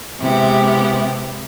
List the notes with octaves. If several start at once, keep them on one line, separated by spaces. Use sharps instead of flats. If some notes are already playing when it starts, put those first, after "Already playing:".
C3 G#3 B3 E4 G4